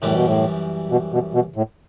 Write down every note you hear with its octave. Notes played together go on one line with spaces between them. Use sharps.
F#2 A2 E3 G3
B2
A2
B2
B2
B2
A2